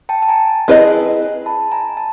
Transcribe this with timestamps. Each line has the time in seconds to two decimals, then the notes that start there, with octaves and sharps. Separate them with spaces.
0.09 G5 A5
0.22 A5
0.29 G#5 A#5
0.68 C4 E4 G#4 B4 D#5
1.46 A5 B5
1.72 G#5 A#5
1.97 A5